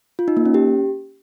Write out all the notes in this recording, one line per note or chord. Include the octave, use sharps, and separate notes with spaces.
F4
D#4
A#3
C#4
G4